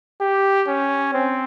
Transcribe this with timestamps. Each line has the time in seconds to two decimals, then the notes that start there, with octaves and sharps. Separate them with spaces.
0.21 G4
0.67 C#4
1.14 C4